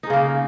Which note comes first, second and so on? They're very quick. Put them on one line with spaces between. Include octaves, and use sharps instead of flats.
D#4 G#3 C#3 A#3